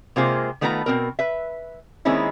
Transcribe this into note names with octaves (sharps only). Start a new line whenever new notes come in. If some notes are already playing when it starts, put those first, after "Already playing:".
C3 G#3 A#3 F4 G#4 C5
D#3 A3 B3 F4 B4 A#5
B2 C4 A#4
B4 E5
D#3 G#3 A#3 C4 C#4 E4